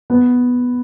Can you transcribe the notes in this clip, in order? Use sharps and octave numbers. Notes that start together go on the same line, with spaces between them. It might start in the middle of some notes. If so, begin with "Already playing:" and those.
B3